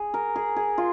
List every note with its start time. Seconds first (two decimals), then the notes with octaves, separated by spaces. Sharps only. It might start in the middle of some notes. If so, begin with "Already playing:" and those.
Already playing: G#4
0.14 A#4
0.36 G#4
0.56 G#4
0.78 F4